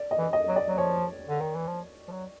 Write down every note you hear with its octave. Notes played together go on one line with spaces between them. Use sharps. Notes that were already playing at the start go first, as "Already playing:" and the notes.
Already playing: D5
D#5
E3
D#5
F#3
D5
F#3
F3 C#5
D3
D#3
E3
F3
F3
F#3